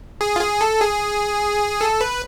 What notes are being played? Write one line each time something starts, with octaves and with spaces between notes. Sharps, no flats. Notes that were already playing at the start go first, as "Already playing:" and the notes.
G#4
F4
G#4
A4
G#4
A4
B4